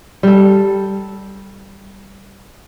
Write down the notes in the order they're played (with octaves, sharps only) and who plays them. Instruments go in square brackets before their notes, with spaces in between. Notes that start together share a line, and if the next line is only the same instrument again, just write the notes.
[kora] G3 A4